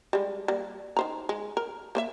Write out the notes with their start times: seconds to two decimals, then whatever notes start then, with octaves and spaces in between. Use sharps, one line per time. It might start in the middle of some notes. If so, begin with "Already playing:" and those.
0.13 G3 G#3
0.48 G3 A#3
0.97 D#3 C5 A#5
1.29 G#3
1.57 A#4
1.95 A#3 C5 E5